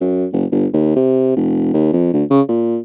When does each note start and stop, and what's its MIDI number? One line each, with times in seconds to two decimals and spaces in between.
0.01 0.26 42
0.33 0.45 30
0.51 0.66 31
0.73 0.95 39
0.96 1.35 48
1.36 1.71 29
1.74 1.90 39
1.93 2.10 41
2.13 2.24 38
2.30 2.41 49
2.49 2.78 46